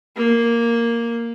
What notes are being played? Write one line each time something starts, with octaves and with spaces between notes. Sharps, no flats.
A#3